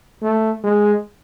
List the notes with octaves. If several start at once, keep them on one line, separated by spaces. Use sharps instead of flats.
A3
G#3